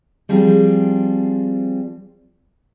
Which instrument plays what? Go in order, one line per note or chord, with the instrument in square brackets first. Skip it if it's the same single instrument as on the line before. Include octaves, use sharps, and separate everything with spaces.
[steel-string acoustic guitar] F3 G3 C4 G#4